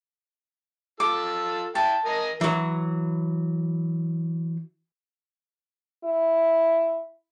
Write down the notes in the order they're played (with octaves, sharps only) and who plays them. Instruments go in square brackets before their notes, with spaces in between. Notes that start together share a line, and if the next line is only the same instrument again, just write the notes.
[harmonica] F4 A4 E6 [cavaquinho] D6
[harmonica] E4 G5 [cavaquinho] A5
[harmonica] A#4 D#5 G#5
[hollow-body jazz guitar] E3 F#3
[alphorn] E4